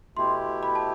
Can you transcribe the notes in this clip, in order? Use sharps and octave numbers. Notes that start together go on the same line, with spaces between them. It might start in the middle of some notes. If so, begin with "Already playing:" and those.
B2 A3 E4 G4 C6
B5
A5